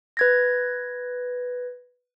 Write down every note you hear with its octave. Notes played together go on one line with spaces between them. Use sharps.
B4 G#6 A#6